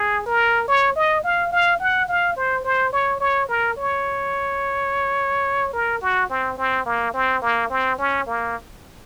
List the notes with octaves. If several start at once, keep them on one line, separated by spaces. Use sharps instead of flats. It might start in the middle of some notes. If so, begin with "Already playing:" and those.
Already playing: G#4
A#4
C#5
D#5
F5
F5
F#5
F5
C5
C5
C#5
C#5
A#4
C#5
A#4
F#4
C4
C4
A#3
C4
A#3
C4
C#4
A#3